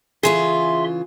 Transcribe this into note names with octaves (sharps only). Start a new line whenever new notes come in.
C#3 E3 F4 G#4 E5 C6